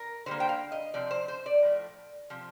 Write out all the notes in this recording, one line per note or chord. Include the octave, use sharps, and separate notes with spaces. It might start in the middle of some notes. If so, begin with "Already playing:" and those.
Already playing: A#4
D3 G3 A#3 C5
G5
F5
D#5
C3 F3 C4 D5
C5
C5
D5
A2 F3 A3
C3 F3